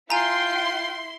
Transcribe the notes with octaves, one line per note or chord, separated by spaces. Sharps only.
E4 F4 G5 G#5 A#5 C6